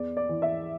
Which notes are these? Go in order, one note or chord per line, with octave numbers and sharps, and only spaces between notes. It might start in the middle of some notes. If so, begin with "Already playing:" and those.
Already playing: E2 D5
D5
E3
E5